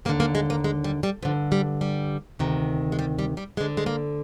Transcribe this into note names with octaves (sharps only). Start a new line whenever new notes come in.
D#2 D3 A#3
A#3
G#3
A#3
G#3
G3
G3
G2 D3 F3
G3
G3
D2 C3 D#3
G#3
G3
G3
G3
D2 D3 G#3
G#3
A#3